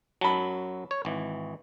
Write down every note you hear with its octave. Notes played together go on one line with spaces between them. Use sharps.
F#2 F#3 A5 B5
C#5
G#1 E3